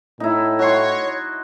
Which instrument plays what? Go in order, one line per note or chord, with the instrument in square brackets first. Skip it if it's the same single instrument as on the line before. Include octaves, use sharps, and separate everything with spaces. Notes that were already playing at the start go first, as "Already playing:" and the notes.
[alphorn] A2 [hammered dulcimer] D#4 E4
[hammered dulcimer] F#4 C6 [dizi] C#5